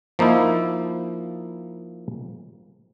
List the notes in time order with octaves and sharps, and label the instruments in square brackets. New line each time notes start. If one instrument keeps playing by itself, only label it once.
[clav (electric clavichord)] F3 A#3 D#4 E4